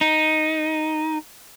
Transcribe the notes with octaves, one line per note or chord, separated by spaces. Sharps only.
D#4